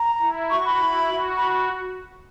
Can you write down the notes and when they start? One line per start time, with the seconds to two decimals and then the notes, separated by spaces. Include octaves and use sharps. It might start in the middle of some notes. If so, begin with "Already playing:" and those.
Already playing: A#5
0.21 E4
0.51 F#4 C#6
0.65 B5
0.80 E4
1.08 F#4
1.37 B5